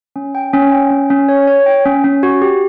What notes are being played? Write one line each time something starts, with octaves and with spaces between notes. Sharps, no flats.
C#4
G5
C#4
G5
C#4
C#4
C#5
C#5
G5
C#4
C#4
F#4
G4